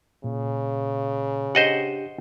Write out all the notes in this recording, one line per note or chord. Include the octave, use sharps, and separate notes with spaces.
A#2 C#3
D4 G4 C5 D#5 F#5